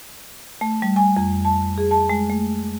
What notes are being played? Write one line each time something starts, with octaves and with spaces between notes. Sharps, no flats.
A3
G3
G#5
F2
A5
G#4
A5
G#3
A3